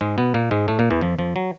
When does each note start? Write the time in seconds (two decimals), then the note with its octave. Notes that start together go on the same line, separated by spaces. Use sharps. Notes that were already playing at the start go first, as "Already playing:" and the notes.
0.01 G#2 G#3
0.18 B2 B3
0.34 A#2 A#3
0.51 G#2 G#3
0.68 A2 A3
0.79 A#2 A#3
0.90 E2 E3
1.01 F2 F3
1.18 F2 F3
1.36 F#3